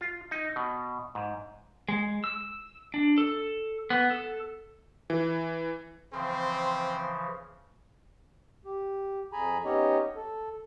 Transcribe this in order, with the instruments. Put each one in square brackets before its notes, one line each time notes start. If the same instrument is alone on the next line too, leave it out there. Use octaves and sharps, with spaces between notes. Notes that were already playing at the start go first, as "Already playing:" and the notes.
[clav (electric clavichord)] F4
D#4
B2
G#2
[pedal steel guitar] G#3
E6
D4
A4
B3
A4
[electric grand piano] E3
[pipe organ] C#3 E3 F3 [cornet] C4 [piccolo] C6
[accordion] G4
F2 G#4 G#5 A#5 B5
B3 C#4 D#4 G4 C#5 D#5
A4